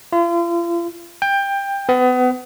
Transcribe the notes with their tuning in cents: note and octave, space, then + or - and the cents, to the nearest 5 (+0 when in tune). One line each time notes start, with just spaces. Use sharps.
F4 -40
G5 +20
B3 +30